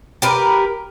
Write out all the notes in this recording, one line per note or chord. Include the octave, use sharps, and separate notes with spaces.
G4 A#4 B4